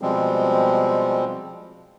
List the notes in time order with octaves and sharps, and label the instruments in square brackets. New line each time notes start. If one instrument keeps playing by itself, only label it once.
[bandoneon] B2 F3 G3 G#3 C4